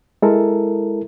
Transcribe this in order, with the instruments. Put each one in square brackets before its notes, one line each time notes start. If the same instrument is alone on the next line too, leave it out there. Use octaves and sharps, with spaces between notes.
[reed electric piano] G#3 E4 A4 A#4